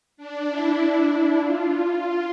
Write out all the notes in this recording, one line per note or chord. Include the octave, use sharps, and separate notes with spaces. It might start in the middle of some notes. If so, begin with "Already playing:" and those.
D4
E4
F4